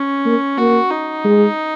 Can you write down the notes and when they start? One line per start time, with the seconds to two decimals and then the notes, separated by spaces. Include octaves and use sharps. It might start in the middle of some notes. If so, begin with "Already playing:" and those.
Already playing: C#4
0.25 A#3
0.58 A#3 F#4
0.91 D#4
1.24 G#3